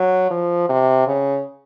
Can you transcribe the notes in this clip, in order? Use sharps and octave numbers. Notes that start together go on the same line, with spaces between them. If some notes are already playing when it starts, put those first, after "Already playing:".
Already playing: F#3
F3
C3
C#3